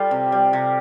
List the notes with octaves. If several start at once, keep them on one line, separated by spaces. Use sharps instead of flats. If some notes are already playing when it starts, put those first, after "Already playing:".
Already playing: G3 F4 A4
C3
G3
C3